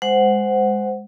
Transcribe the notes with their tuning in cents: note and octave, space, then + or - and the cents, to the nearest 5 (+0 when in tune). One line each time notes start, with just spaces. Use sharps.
G#3 -10 C5 -10 F#5 +0